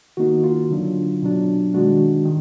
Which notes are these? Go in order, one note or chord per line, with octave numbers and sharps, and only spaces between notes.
D#3 A#3 D#4 F#4
F4
D3 F#3 D4
B2 F#3 D4
D#3 G#3 D4 F#4
D#3